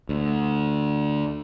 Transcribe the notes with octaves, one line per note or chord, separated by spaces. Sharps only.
D2